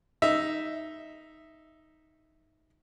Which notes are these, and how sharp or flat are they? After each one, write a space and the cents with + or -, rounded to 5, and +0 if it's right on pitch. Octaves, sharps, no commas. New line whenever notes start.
D#4 +5 E5 +0